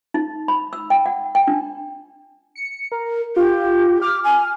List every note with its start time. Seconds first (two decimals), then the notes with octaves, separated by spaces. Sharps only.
0.14 D#4
0.48 B5
0.73 E6
0.90 G5
1.06 F#5
1.35 G5
1.47 D4
2.55 C#7
2.92 A#4
3.36 F4 G4
4.02 D6 F6
4.24 G#5